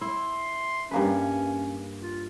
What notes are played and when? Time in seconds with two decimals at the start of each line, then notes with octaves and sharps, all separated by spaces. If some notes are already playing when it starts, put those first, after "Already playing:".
0.01 E4 C6
0.91 G2 A#3 C#4 B4
2.02 F4